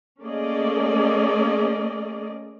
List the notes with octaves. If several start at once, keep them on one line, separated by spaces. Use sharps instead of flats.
A3 A#3 C#4 G#4 D5 D#5